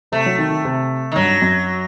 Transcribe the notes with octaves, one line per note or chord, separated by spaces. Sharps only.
C3 A3
F#3
D#3
D#3
C3
D#3
G2 F#3
F#2